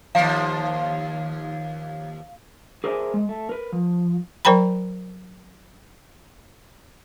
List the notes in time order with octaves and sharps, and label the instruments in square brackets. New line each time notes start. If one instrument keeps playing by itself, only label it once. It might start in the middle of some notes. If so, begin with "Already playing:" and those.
[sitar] D#2 F3 [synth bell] F5
[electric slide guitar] G#4 A#4 C5 D5 E5 G#5
G#3
A3
A#4 B4
F3
[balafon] F#3 A#4 C5 G5 A#5 B5